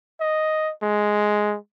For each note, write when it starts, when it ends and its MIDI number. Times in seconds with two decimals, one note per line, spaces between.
0.21 0.73 75
0.83 1.57 56